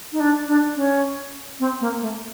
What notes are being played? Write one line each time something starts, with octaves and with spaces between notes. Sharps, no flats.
D#4
D4
D4
C#4
C4
A#3
A3